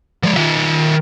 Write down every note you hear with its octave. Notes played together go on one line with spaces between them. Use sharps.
F3 G#3
D#3 E5